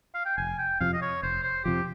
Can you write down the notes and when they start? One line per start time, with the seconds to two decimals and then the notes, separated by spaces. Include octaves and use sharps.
0.15 F5
0.26 G5
0.38 F1 G#5
0.59 G5
0.80 F2 C3 F3 F5
0.94 D#5
1.02 C#5
1.23 F1 C5
1.44 C5
1.64 F2 C3 F3 G4